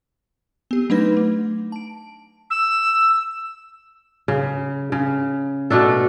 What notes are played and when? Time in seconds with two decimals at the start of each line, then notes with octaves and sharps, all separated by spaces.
0.71 B3 G4
0.90 F#3 A3 D4 D#4 B4 A#6
1.17 A3
1.72 A5 D7
2.50 E6
4.28 C#3
4.92 C#3
5.70 B2 A3 D4 A4